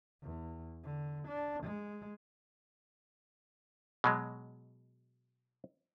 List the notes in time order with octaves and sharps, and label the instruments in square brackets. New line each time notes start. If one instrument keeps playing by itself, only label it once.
[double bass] E2
D3
D4
G#3
[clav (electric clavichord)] B2 F#3 G#3